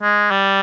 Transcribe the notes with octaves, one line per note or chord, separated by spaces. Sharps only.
G#3
G3